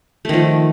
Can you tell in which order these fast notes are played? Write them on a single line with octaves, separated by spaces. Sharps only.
A3 D#3 F3